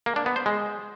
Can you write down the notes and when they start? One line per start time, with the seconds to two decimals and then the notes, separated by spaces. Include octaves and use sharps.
0.06 A#3
0.16 D4
0.26 B3
0.36 C5
0.46 G#3